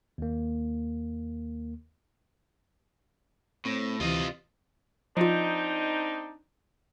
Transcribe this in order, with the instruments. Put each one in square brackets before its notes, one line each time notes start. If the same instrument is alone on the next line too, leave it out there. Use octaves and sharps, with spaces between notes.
[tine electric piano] D#2 A#3
[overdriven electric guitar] A2 [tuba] C4
[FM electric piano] D2 E3 [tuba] C3 [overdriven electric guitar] F4 D#5
[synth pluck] F3 F4 [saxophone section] C4 D4 D#4